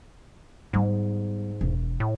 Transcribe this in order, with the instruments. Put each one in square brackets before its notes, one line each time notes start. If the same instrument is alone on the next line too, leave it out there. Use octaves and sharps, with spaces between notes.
[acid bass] G#2 [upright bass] G3 B3
[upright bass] E1
[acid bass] A2